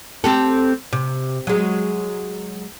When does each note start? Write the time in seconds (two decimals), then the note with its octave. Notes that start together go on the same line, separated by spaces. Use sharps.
0.24 C4 G4 A4
0.93 C3
1.47 F#3 G#3